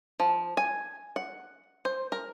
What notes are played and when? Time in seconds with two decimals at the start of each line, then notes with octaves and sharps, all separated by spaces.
0.20 F3
0.57 G#5
1.16 F#5
1.85 C5
2.12 A#4